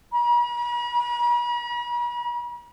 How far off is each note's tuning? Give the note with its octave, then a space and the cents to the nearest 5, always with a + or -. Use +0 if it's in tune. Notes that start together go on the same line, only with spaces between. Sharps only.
B5 -45